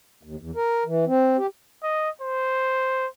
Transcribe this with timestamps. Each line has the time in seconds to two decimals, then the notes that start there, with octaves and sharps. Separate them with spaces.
0.23 D#2
0.39 E2
0.56 A#4
0.86 E3
1.07 C4
1.38 G4
1.83 D#5
2.22 C5